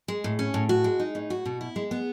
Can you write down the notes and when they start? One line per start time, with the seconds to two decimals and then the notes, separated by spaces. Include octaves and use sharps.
0.08 G#3
0.24 A2
0.39 C#4
0.54 A2
0.69 F#4
0.84 G#3
1.00 D#4
1.15 A2
1.30 F#4
1.45 B2
1.61 E4
1.76 G#3
1.91 B3